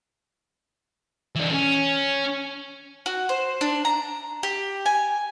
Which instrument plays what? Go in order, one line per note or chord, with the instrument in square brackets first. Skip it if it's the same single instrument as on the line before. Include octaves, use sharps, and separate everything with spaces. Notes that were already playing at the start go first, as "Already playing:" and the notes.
[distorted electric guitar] E3 D4
C#4
[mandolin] F#4
C5
D4
A#5
G4
G#5